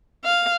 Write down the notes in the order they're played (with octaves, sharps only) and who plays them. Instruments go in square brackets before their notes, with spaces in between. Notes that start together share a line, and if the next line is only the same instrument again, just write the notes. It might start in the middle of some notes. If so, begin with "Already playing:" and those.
[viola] F5